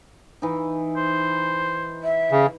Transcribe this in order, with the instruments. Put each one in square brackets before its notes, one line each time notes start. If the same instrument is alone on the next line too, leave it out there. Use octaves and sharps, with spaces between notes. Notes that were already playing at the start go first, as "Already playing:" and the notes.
[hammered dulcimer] E3 D#4
[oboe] C5
[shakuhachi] E5
[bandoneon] C#3